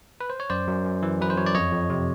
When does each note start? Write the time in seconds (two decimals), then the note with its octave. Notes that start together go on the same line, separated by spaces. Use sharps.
0.21 B4
0.30 C5
0.40 C#5
0.50 F#2 C5 D5
0.67 F#2
0.84 F#2
1.03 E3
1.20 F#2 B4
1.30 C5
1.37 F#2 C#5
1.46 D5
1.54 F2 C#5 D#5
1.71 F2
1.90 C3